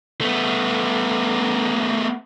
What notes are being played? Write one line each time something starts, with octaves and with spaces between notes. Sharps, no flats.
A3 B3